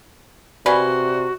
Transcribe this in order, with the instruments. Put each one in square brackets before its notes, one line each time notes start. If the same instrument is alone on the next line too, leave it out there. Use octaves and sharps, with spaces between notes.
[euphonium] C3 [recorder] F#4 [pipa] B4 F5 G#5 [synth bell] D5